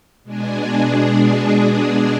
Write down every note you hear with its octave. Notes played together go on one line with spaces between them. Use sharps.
B2 G#3 D4 G#4